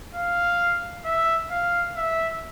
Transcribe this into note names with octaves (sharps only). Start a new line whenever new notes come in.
F5
E5
F5
E5